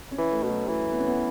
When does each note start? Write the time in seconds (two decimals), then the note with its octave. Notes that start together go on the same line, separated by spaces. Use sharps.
0.11 C#4
0.18 E3
0.31 A3
0.43 B2 A3
0.49 F#3
0.67 E3 A3
0.92 B3
0.99 C#4
1.07 B3